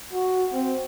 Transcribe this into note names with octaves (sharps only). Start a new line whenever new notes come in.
F#4
C4